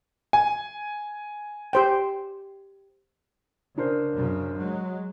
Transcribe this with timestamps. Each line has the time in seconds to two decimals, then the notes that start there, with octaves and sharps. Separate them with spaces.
0.33 G#5
1.73 G4 C5 G5
3.78 C#3 D4 A#4 C5
4.15 F#2 C#3
4.58 F#3 G#3